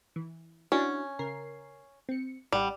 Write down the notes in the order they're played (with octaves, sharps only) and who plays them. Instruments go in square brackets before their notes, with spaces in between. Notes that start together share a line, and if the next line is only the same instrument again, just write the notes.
[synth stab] E3
[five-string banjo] C#4 [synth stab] D4 E4 F#4
[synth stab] C#3 A#4 C7
C4 C#7
[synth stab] A1 F#5 [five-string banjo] G3